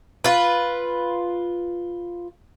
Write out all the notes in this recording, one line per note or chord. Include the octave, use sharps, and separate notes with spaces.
F4 B4